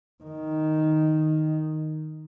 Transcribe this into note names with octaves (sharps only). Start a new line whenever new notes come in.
D#3